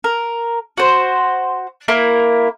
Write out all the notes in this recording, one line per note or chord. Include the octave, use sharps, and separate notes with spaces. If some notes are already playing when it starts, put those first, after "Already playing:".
A#4
F#4 C5
A#3 E4 A#4